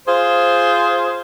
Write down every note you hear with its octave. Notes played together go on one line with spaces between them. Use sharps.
F4 G#4 C5